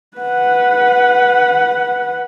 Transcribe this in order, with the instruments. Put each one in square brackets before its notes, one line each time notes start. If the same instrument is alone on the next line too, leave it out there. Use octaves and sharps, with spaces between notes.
[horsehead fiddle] B4 F#5